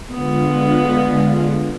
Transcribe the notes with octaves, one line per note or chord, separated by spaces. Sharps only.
D3 G#3 B3 F4